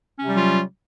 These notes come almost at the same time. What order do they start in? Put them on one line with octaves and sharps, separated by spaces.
C#4 C3 G3 F#3 F4